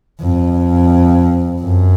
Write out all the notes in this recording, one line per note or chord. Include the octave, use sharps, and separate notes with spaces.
F2
F#2